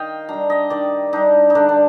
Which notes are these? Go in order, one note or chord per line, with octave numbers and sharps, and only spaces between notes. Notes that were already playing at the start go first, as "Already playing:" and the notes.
Already playing: D#3 D#5 F5 G5
G3 D4 A#5
D#5
D#3 D5
G3 D4 D#4
D#4
D3 D4
D4